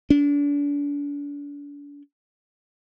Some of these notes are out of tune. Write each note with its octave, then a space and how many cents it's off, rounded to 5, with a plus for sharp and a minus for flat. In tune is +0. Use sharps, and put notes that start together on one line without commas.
D4 -35